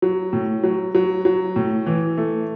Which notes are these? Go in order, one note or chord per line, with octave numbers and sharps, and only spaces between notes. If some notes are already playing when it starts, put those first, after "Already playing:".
F#3
A2
F#3
F#3
F#3
A2
E3
A3